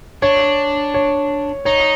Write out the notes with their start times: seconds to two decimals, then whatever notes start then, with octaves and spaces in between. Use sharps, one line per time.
0.22 D4 C#5
0.94 C#5
1.65 D#4 C#5